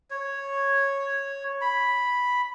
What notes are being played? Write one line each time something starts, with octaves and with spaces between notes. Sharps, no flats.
C#5
B5